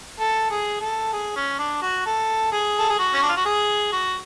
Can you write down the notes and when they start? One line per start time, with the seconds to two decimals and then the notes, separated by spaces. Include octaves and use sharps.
0.20 A4
0.51 G#4
0.81 A4
1.13 G#4
1.36 C#4
1.59 D4
1.82 F#4
2.06 A4
2.52 G#4
2.78 A4
2.89 G#4
2.99 F#4
3.13 C#4
3.22 D4
3.29 F4
3.37 F#4
3.45 G#4
3.92 F#4